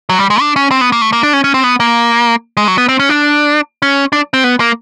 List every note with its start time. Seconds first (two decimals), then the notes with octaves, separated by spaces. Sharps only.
0.09 F#3
0.19 G3
0.30 G#3
0.40 D4
0.56 C#4
0.71 C4
0.81 B3
0.92 A#3
1.02 A3
1.13 A#3
1.23 D4
1.33 C#4
1.44 C#4
1.54 C4
1.64 B3
1.80 A#3
2.57 G#3
2.68 F#3
2.78 B3
2.89 C4
2.99 C#4
3.09 D4
3.82 C#4
4.13 D4
4.34 C4
4.44 B3
4.60 A#3